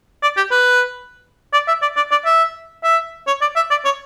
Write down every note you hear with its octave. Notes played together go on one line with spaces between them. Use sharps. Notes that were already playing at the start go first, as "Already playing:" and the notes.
D5
G4
B4
D5
E5
D5
D5
D5
E5
E5
C#5
D5
E5
D5
C#5